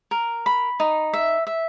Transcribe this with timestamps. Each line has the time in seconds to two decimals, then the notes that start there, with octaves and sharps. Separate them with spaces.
0.11 A#4
0.46 B5
0.80 D#4
1.13 E5
1.47 E5